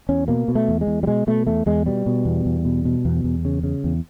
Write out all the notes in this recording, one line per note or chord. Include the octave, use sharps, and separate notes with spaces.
E2 C#4
B2 A#3
B2
A3
E2
G#3
E2
G3
B2 G#3
B2 A3
E2 A3
E2 G#3
B2 G3
B2
E2
E2
B2
B2
E2
E2
C#3
C#3
E2